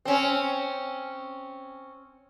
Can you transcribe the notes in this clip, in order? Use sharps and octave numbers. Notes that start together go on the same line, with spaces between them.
C4 C#4